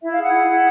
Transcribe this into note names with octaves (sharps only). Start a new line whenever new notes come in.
E4 E5
G#4 F5
F#5
E4
E4